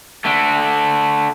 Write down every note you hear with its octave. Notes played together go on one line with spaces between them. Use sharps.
D3 A3